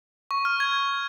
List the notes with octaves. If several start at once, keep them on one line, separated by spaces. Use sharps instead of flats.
C#6
F6
G#6